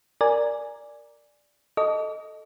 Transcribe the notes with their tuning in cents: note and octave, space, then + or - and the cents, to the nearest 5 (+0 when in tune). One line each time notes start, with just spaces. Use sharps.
A#4 +0 D5 +0 G#5 +0
A4 +0 D#5 +0 D6 -40